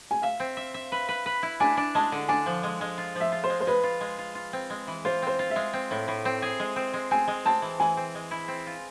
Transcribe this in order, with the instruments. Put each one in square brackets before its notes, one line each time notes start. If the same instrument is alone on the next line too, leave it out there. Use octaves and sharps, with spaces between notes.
[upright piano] G#5
[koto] E5 [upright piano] F5
[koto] C4
E5
E5
B4
B4
B4
E4
[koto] D4 [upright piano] G#5
[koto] D4
[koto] G#3 [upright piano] A5
[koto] D3
[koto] D4 [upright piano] G#5
[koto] F3
G#3
G#3
F4
[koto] F3 [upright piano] E5
[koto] F4
[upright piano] C5
[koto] G#3
[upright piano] C5
[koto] G#3 [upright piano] B4
[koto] F4
G#3
F4
F4
C4
G#3
E3
[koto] F4 [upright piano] C5
[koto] C4 [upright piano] C5
[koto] F4
[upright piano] E5
[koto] G#3
C4
A2
A2
C4
G#4
G#3
C4
G#3
[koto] C4 [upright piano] G#5
[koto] G#3
[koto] C4 [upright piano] A5
[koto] E3
[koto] E3 [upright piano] G#5
[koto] C4
G#3
E4
C4
F4